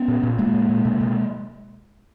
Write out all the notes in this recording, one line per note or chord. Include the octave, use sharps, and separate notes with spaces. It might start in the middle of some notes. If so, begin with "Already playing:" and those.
Already playing: B3 C#4
A#2
A#2
A#2 G#3 A#3
A#2
A#2
B2
B2